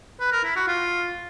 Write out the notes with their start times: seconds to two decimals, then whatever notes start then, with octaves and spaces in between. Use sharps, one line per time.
0.20 B4
0.32 A#4
0.44 E4
0.56 F#4
0.68 F4